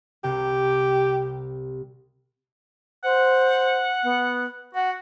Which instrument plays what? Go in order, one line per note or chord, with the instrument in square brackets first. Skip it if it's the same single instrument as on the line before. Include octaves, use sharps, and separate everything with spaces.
[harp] C2 C3 [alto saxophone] G4
[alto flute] C5 [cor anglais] F#5
[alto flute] B3
[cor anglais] F#4 [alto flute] F#5